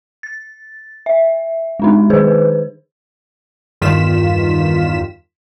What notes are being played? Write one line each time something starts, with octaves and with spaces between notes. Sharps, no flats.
A6
E5
G#3 D4 D#4
D#3 G#4 B4 C5
E2 G2 D#3 F4 B6 E7